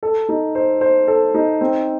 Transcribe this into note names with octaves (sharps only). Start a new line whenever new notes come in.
A4
D#4
C5
C5
A4
D#4
C4